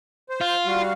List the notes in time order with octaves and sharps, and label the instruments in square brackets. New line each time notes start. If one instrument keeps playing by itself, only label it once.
[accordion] C5
[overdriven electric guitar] F4
[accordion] G3 F#4 F5